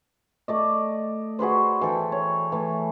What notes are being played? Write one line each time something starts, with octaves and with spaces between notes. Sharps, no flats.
A3 D5 D#5
F#4 G#4 B4 C5
E3 A4 G5
C#5
E3 A3